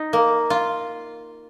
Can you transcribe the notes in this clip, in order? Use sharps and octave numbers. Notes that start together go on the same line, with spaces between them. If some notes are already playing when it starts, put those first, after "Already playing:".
Already playing: D#4
A#3
F4